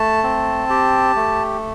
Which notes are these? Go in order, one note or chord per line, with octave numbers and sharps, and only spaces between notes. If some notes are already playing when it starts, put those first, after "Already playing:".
Already playing: A3 A5
C4
G4
A3